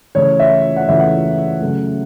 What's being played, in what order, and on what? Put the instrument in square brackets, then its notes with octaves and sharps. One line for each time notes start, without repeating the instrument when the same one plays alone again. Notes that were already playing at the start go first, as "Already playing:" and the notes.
[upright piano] C#3 E3 A3 C#5
E5
F#5
C#3 E3 A3 E5
F#5
C#3 F#3 A3